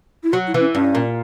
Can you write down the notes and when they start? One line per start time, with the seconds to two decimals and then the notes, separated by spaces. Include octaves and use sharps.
0.24 E4
0.33 F#3 F#4
0.47 E4
0.54 E3
0.60 C#4
0.75 G2 C#4
0.95 A#2